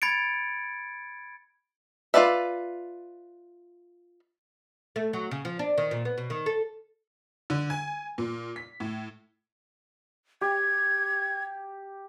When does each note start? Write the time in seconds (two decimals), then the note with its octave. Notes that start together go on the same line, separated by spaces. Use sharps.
0.02 B5 G#6 A6 C#7 D7
2.14 F4 G#4 B4 D5 E5
4.96 A3
5.13 F#3
5.31 C#3
5.45 F3
5.59 D4
5.78 D#3
5.91 A#2
6.05 B3
6.18 B2
6.30 D#3
6.46 A4
7.50 D3
7.70 G#5
8.18 A#2
8.56 B6
8.80 A2
10.41 G4 G#6